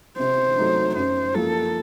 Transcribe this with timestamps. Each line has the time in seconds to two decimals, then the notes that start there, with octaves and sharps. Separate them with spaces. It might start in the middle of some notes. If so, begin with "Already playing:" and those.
0.19 C3 C5
0.57 F#3 A3 D#4
0.96 F#2 C5
1.35 F3 A#3 F4 A4